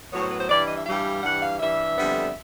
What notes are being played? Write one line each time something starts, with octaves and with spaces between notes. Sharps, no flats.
A2 F#3 B3 C#5
C5
B4
C5
G2 E3 G3 D5
D#5
E5
G2 E3 G3 F5
G2 E3 G3 F#5
F5
G2 E3 G3 E5
F2 D3 G3 B3 D4